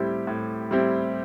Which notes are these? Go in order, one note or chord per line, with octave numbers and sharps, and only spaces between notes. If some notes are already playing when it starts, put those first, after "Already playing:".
Already playing: A2 G3 C4 E4 G4
A2
G3 C4 E4 G4